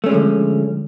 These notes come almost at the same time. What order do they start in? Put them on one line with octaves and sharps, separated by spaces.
A3 C#4 G#3 F3 D3